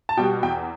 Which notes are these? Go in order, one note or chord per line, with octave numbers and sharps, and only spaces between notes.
A5
B2 G3 G5
E2 G5